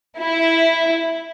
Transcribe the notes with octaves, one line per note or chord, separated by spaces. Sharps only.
E4